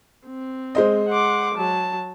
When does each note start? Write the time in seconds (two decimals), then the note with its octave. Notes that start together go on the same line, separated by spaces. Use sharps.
0.25 C4
0.75 G#3 C5 D#5
1.08 F#5 C6 D6
1.54 F#3 A5